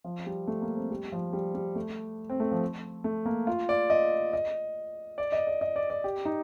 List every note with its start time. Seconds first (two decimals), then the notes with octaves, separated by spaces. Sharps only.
0.04 F3
0.26 G3
0.47 A3
0.62 A#3
0.77 C4
0.90 G3
1.12 F3
1.33 G3
1.55 G3
1.75 A3
2.30 C4
2.40 A3
2.51 F3
3.04 A3
3.26 A#3
3.47 F4
3.69 D5
3.90 D#5
4.33 D#5
5.18 D5
5.32 D#5
5.47 D5
5.61 D#5
5.76 D5
5.90 D5
6.04 G4
6.25 D#4